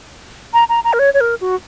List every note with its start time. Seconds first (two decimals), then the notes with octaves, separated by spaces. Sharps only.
0.54 A#5
0.69 A#5
0.84 A#5
0.93 A#4
0.99 C#5
1.14 C#5
1.21 A#4
1.41 F#4